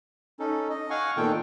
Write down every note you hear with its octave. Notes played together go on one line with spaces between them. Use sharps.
C#4 D#4 A4
D#5
F5 F#5 G#5 C#6
A#2 D#3 B3 A4 G5